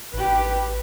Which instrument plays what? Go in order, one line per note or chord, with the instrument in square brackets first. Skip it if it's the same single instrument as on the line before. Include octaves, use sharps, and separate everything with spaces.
[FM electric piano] A1 [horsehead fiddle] G4 B4